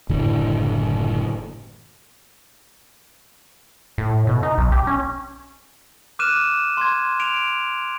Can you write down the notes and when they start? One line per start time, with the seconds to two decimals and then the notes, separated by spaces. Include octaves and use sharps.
0.09 F#1 A2 D3 E3
3.98 A2
4.27 B2
4.43 D#4
4.58 B1
4.72 G4
4.87 C#4
6.19 D6 F6 F#6 D#7 E7
6.77 C6 G#6
7.20 D7 F7